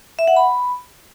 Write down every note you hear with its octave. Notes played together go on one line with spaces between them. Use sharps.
E5
F#5
B5